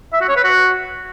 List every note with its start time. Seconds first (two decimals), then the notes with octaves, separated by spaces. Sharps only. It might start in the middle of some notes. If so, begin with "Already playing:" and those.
0.13 E5
0.21 F#4
0.29 C#5
0.36 B4
0.44 F#4